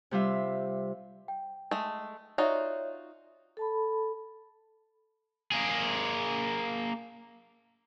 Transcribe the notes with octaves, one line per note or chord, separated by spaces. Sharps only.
C3 G3 F4 E5
G5
G#3 A3
D#4 F4 F#4 C#5 D5 E5
A4 A5 B5
A#3 G#4